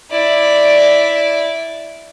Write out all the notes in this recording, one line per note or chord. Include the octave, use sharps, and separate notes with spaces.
E4 D5